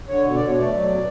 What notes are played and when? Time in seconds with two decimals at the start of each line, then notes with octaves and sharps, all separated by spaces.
0.08 D3 C#5
0.25 B2
0.35 D5
0.41 B2
0.46 C#5
0.57 A3 D5
0.72 F#3
0.88 B2